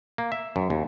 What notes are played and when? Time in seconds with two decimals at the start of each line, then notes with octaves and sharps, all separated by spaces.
0.18 A#3
0.32 E5
0.56 F#2
0.70 D#2